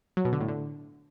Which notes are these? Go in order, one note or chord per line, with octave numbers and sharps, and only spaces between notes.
F#3
B2
D3
A2
D3